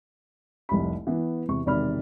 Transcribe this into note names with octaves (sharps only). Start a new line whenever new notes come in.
F1 C2 B5
E3 B3
E2 C3 C#6
E1 C3 D#3 D5 B5 F6